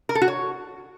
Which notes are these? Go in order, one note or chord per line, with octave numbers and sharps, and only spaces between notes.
A#4
A4
F#4
C#5